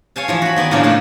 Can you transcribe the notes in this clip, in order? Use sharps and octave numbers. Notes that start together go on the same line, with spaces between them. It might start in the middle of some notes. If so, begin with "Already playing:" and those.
C#5 F5 G#5 A5
E3 F3 C#5
F#4 B5
D#3 B3 D5 G#5
A2 C#3 F3 A#3 C#4 D4
A3 D4 D#4 B4